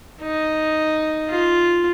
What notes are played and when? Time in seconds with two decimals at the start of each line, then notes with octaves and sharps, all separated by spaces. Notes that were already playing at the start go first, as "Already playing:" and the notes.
0.21 D#4
1.30 F4